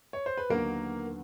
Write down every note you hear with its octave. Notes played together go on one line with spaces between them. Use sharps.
C#5
C5
B4
D#2 D3 F#3 A#3 B3 A#4